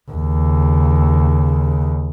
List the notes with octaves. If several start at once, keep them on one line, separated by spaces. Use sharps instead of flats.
D#2 C#3